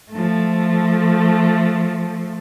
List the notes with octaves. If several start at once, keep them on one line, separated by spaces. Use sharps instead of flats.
F3 A3